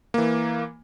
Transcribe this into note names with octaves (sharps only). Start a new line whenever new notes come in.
E3 A#3